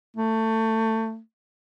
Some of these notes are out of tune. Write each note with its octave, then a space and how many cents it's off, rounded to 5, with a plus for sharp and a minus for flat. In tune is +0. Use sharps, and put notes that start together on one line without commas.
A3 +20